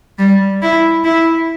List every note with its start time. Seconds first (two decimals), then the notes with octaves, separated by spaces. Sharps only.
0.19 G3
0.62 E4
1.04 E4